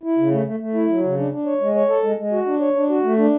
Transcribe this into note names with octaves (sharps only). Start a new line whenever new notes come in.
E4
C#3
A3
A3
A3
E4
F#3
C#3
D4
D4
C#5
G#3
C#5
A4
G#3
G#3
F#4
D4
C#5
D4
F#4
A3
D4